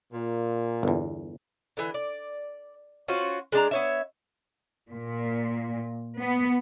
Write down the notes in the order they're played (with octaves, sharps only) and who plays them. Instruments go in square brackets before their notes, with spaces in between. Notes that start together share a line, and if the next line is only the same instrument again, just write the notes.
[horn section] A#2
[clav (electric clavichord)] G1 E2
[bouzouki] D3 E3
D5
C#4 F4 F#4 C5
G#3 D4 A#5
B3 C#5 E5
[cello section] A#2
B3